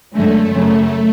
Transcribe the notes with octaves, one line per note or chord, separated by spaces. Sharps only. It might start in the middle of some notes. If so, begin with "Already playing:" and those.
F#2 D3 G#3 A3
F#2 C#3 F#3